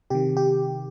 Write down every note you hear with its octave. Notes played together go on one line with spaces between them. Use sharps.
C3 D#3 G4
G4